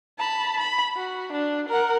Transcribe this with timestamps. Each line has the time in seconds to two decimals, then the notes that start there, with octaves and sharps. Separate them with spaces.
0.19 A5 B5
0.58 B5
0.96 F#4
1.32 D4
1.69 A#4 F#5